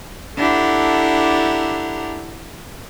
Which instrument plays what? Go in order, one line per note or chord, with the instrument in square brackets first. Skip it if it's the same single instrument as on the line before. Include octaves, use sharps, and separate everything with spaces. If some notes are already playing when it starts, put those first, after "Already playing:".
[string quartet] D4 E4 G4 A4 F#5 A#5